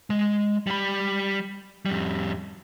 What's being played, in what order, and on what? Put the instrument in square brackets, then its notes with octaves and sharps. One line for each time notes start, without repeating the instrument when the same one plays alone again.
[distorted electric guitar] G#3
G3 B5
F2 G3